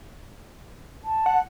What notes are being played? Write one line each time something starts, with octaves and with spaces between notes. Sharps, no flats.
A5
F#5